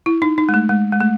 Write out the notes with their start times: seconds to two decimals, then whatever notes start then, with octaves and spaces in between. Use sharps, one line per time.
0.06 E4
0.22 D#4
0.38 D#4
0.49 G#3
0.54 A3
0.69 G#3
0.92 G#3
1.00 A3